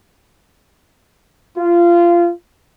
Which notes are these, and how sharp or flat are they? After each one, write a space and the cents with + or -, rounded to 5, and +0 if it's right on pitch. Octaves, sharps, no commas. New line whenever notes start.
F4 -20